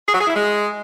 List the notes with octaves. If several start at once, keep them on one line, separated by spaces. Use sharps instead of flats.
G#4
F#3
G#4
E4
G#3